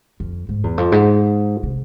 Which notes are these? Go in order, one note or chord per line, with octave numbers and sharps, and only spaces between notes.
F2
G#2
E2
F2
G#2
C3